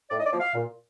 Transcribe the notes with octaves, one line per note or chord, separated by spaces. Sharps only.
A2 D5
D#5
D5
F3 A#3
F5
A#2